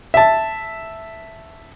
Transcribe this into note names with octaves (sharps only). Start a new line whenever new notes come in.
E5 A5